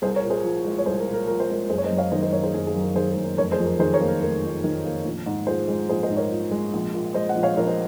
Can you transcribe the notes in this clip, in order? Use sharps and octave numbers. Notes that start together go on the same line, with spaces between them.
C2 G#4 C5
A#4 C#5
A#2
G#4 C5
F3
G#3
C#5
C2 G#4 C5
A#4
A#2
A#4
F3 A#4
C5
G#3 A#4
F#1 G#4 C5
C#5
C5 D#5
F#2
C#5 F5
D#3 C5 D#5
C5 D#5
F#1 A#4 C#5
G#4 C5
F#1 G#4
G#4
F#2
A#4
D#3 G#4 C5
G#4
F#1
A#4
F1 A#4 C#5
G#4 C5
F2
A#4
D#3 G#4 C5
A#4 C#5
A#3
A#4
F1 A#4
F2
D#3
A#3
A#1
G#2
F3 G#4 C5
G#3
A#1 G#4 C5
C5 D#5
G#2
A#4 C#5
F3
G#3
A#1
A#2
G#3 C5 D#5
D#5 F#5
A#1
C#5 F5
A#1 A#4 C#5
C5 D#5